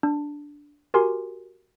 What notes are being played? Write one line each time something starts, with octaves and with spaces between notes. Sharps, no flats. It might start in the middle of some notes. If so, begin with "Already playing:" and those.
D4
F#4 G4 A#4 G#5 C6